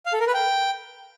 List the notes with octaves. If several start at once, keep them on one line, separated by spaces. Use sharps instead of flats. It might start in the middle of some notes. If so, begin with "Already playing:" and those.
F5
A4
A#4
B4
G5